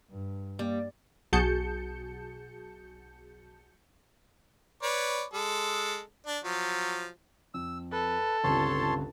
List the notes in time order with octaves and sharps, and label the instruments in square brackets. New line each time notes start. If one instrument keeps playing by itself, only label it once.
[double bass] G2
[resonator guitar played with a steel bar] G3 [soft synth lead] A#3
[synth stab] B1 F#4 G#4 A5 G6 C#7
[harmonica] B4 C#5 D5
G#3 A4
D4
F3 F#3
[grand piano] F2 [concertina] E6
[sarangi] A4 [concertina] B4
[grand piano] G1 C#2 C3 [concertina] C#5 A5 C6